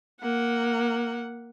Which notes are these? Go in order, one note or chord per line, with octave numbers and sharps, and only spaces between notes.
A#3 F#5